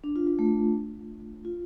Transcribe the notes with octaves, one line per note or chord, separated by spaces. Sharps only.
D4
F4
F4
A3
F4